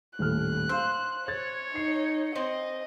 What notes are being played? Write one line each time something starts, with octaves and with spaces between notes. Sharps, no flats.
D#1 A2 F6 F#6
C5 F5 C6 E6
C#5 G#6 A6
D#4 C7
C4 D#5